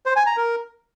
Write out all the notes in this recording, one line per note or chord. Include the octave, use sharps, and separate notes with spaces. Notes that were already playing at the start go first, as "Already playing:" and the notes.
C5
G#5
A#5
A#4